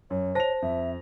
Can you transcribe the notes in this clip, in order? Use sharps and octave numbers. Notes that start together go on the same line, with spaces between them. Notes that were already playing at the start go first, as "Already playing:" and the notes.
F#2 C#5
C5 A5 A#6 F7
F2 E5